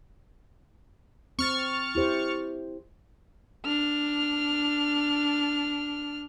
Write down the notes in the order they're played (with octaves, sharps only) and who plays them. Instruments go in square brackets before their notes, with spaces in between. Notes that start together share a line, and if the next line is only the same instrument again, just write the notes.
[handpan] C4 [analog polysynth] C#6 F6 A6
[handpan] E4 G4 C5
[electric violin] D4 F6